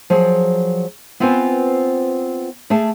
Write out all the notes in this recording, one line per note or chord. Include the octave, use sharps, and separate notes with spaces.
F3 F#3 G#4
B3 C4 F4 B4 C5 G#5
A3 G#4 G5 A5